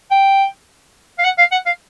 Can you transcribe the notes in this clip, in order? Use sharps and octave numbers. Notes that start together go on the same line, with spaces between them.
G5
F5
F#5
F5
F#5
F5